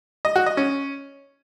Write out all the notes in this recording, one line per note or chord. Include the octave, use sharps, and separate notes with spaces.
D#5
F#4
D#5
C#4